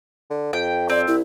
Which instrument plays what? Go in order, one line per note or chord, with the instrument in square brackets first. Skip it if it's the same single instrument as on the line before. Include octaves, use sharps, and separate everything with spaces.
[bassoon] D3
[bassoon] F2 [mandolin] G5
[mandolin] C4 [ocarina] D5
[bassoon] C2 [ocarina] E4